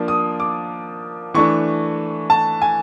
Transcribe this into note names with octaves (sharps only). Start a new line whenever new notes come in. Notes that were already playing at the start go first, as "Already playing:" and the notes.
Already playing: F3 A#3 D4
D#6
D6
E3 A3 D4 C#6
A5
G#5